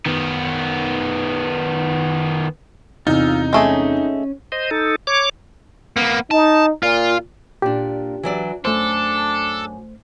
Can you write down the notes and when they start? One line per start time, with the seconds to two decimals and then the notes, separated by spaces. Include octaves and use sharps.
0.06 D#3 B3
3.07 E2 C3 D#4 F4 F5 E6
3.53 G#3 A3 C#4 G#4
4.52 C5 D#5
4.71 D#4 A4
5.07 C#5 D6
5.97 A#3 B3
6.31 D#4 A5
6.83 A#2 F4
7.62 A#2 D4 G4
8.23 E3 F#3 D5
8.65 F#2 A3 D4 A4 C5